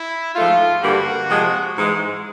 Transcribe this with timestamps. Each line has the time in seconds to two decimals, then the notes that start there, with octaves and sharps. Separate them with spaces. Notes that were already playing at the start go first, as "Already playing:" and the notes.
Already playing: E4
0.35 G#2 F3 A3 F4
0.82 G2 D3 G3 A#3 F#4
1.28 C3 F3 G#3
1.74 G#2 E3 G#3